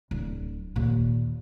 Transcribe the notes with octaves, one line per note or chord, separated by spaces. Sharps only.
D1
D#2 A#2